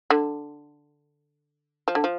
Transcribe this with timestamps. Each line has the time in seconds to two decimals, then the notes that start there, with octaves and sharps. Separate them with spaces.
0.10 D3
1.88 F3
1.95 D3
2.04 F3